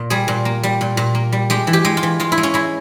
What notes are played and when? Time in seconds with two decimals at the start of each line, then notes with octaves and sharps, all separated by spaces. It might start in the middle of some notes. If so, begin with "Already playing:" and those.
Already playing: A#2 A#3
0.10 G3 G#4
0.28 A#2
0.45 A#3
0.63 G3
0.81 A#2
0.97 A#2
1.15 A#3
1.32 G3
1.50 G#3 G4
1.67 E3
1.73 G4
1.85 G#3
1.97 F4
2.03 E3
2.20 G#3 F4
2.32 E4
2.38 G#3
2.43 C#4
2.54 G#3 E4